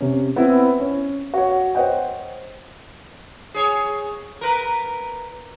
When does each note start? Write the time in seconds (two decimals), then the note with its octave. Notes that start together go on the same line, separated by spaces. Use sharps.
0.01 C3 C#4
0.36 B3 C4 E4
0.80 C#4
1.34 F#4 C#5
1.75 C5 C#5 D#5 F#5 G5
3.54 G#4 C#5
4.41 A#4 B4